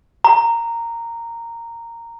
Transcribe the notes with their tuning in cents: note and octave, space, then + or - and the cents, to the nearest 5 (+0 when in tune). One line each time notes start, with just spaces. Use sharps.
A#5 -10